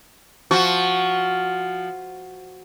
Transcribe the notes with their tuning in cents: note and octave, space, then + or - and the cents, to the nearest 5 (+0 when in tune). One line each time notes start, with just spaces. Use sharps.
F3 +0 F#4 +0